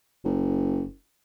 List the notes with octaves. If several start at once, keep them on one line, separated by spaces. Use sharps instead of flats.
F#1